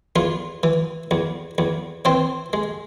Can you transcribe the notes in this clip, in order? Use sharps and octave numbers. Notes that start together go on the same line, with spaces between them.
E2 F4
E3
E2
E2
E3 C4 C5
G#3